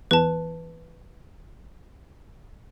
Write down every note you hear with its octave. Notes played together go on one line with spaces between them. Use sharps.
E2 B4 A5